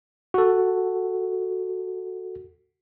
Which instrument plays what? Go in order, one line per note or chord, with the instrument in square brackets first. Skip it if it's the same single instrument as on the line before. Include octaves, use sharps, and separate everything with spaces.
[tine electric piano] F#4 A4